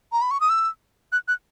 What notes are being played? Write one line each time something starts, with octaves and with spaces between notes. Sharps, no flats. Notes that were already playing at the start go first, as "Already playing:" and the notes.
A#5
B5
C#6
D#6
E6
F#6
F#6